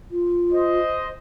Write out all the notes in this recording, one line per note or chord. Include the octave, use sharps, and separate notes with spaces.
F4
C5 D#5